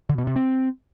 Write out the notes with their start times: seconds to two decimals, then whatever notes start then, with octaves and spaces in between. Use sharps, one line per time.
0.09 D3
0.18 B2
0.27 C3
0.36 C4